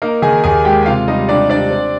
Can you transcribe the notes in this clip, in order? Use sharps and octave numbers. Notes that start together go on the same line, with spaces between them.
A#3 D#4 A#4
D#3 G#4 G#5
D#2 G#4 G#5
G#3 G4 G5
G5
C3 F4 F5
G3 D#4 D#5
C3 D4 D5
C4 D4 D5
C4